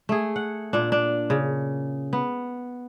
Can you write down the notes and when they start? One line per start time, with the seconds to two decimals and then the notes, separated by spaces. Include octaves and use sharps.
0.09 A3 G#4
0.36 F#5
0.73 A#2 D4
0.92 D4
1.30 C#3
2.13 B3